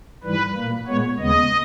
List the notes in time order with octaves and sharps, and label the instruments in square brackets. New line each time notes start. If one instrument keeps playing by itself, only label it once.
[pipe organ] G#2 E3 G3 B4
A#2 A#3
A#2 G#3 B3 C#5
D#2 C#3 G#3 B3 D#5